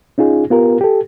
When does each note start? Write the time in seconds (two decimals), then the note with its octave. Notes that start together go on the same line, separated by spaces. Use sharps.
0.18 C#4 D#4 F4 G#4
0.50 B3 F4 G4 A#4
0.81 G4 A4